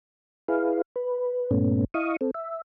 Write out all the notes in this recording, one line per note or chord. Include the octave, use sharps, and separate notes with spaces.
E4 G#4 B4 F5
B4
G2 A#2 A3 B3 C#4
E4 D#5 F5 C#6 D#6
C4 A4
E5